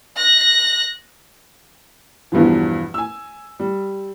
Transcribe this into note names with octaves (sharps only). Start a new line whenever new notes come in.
F#6 A#6
E2 G2 B2 E3 F3
G#5 E6
G3